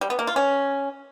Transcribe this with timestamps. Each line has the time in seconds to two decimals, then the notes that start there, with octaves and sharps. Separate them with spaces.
0.01 G3
0.10 B3
0.19 A#3
0.27 F4
0.36 C#4